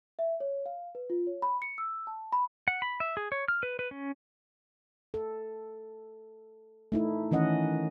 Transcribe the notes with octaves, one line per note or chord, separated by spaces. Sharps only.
E5
C#5
F5
B4
F4
C#5
B5
C#7
E6
A5
B5
F#5
B5
E5
G#4
C#5
F6
B4
B4
C#4
A4
A3 D#4 E4
D#3 E3 C#4 D#5 F#5